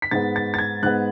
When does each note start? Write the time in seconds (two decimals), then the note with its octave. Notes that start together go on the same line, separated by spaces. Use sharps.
0.02 B6
0.11 G#2 G#3 B3 A6
0.36 A6
0.54 A6
0.58 G#6
0.83 G#2 G#3 B3 F#6